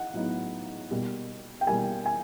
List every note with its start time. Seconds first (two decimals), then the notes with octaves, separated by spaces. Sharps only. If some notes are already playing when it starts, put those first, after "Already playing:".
Already playing: D#4 F#5
0.14 A2 F#3 B3 D#4
0.91 B2 G3 A#3
1.61 G5
1.67 B2 G3 A#3 G#5
2.06 G#5